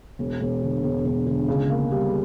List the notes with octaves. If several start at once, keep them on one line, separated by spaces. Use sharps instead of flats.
E1
E1
D3
E1
E1
D3
C#2
A#3
G3